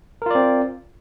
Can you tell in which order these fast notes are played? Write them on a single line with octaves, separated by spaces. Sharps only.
A#4 F4 D5 C4